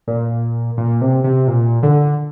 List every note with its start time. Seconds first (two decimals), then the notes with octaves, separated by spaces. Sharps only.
0.07 A#2
0.77 A#2
1.01 C3
1.24 C3
1.48 A#2
1.83 D3